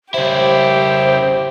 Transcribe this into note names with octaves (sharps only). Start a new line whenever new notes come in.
C#3 E4 G4 C5